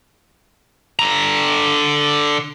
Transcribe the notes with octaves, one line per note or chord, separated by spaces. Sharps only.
D3 A#5